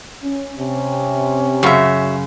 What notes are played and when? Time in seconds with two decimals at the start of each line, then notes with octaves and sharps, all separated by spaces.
0.23 C#4
0.58 C3 C#4
1.63 F#2 C#3 F#4 E5